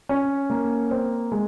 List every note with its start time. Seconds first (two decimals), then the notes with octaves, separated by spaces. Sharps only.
0.09 C#4
0.50 A#3
0.91 C4
1.32 G#3